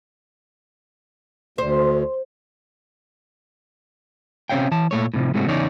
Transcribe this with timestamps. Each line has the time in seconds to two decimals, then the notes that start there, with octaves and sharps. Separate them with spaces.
1.58 D2 C5
4.49 C3 C4 C#4 C#5 F5 G5
4.71 E3 A5
4.91 A#2 A3 C#5
5.14 A2 C3 F3
5.34 G#2 C3 G#3 A3 C4 F#4
5.47 E2 C#3 D#4 C#5 D5